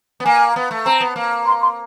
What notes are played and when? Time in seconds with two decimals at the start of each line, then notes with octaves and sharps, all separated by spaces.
0.20 B3
0.26 A#3 G#5
0.56 B3
0.71 A3
0.86 C4 A#5
1.01 B3
1.16 A#3
1.46 C6
1.61 C6